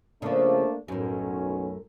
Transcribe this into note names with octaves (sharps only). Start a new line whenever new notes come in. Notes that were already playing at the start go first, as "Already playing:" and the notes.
C#3 F3 A3 A#3 D4
B1 F#2 A2 C#4